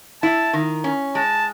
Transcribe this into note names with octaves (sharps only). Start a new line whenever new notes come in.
E4 A5
D#3
C#4
G#3 A5